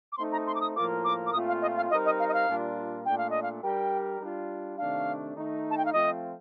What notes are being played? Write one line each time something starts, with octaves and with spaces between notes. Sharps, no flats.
D6
A3 C4 D#4 C6
A#5
C6
D6
D#6
A2 F3 A#3 F4 A#4 D6
D6
D6
A#2 A3 C4 F4 D#6
F5
D#5
F5
G3 C4 D#4 A#4 D#5
D#5
F5
D#5
F5
A#2 G3 D4 F4 A#4
A#2 A3 D4 G5
F5
D#5
F5
G3 D4 G4 A#4 G5
G3 D4 F4
C3 D#3 A3 D4 F5
D#3 A3 D#4
A5
G5
F5
F3 A3 C4 F4 D#5